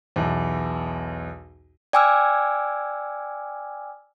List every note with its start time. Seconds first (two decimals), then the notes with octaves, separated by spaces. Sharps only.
0.16 B1 E2
1.93 D5 G5 G#5 D6 E6 F6